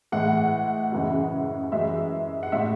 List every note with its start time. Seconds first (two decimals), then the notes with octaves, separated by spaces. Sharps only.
0.12 A2 E3 G#3 F#5
0.92 F#2 C#3 E3 G#3
1.72 F#2 E3 G#3 E5
2.43 F#5
2.52 A2 G#3 E5